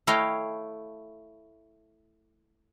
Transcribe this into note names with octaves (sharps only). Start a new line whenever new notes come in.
A3 E4 C#5 D#5 F5 G5